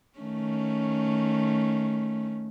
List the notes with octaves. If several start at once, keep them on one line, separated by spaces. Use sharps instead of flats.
D#3 A3 C#4